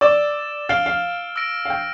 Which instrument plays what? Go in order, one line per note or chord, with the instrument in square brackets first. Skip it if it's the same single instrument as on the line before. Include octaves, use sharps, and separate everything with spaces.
[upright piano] D5 [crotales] E6 A6 E7 G7
[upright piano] F5 [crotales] F6 A6 D7 G7
[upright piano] F5
[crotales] E6 A#6 D7
[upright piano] F5
G5